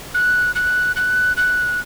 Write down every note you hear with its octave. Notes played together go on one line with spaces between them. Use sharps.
F#6
F#6
F#6
F#6